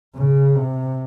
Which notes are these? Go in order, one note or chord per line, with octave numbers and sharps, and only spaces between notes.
C#3
C3